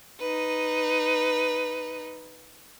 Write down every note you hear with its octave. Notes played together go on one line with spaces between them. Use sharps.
D#4 B4